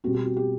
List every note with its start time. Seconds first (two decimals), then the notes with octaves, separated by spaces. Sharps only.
0.04 B2 G3 C4 F#4
0.14 G4
0.25 F#4
0.36 G4